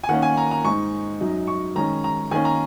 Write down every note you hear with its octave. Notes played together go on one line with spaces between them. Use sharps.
G#5
D#3 A#3 C#4 F#5
G#5
A#5
A#5
G#2 G#3 D#4 C#6
F#2 F#3 D#4
C#6
D#3 G#3 C#4 A#5
A#5
D#3 A#3 C#4 G#5
A#5